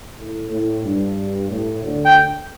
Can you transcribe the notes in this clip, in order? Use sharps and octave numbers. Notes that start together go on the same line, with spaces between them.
A2
A2
G2
A2
D2 D3
G5